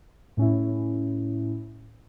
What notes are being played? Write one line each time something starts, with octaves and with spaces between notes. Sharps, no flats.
A2 C#4 E4